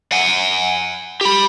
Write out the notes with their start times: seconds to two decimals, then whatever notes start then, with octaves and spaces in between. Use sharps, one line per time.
0.12 F#5 G#5
1.21 G4 B5